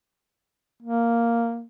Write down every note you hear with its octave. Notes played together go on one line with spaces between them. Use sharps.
A#3